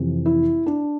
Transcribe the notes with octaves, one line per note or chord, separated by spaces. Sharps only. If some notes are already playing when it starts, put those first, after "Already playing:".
Already playing: F2 C3 E3
E4
D4